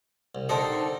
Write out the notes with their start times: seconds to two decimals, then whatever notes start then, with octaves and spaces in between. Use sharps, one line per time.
0.35 C2
0.49 D3 C4 D#4 A4 A#4 C5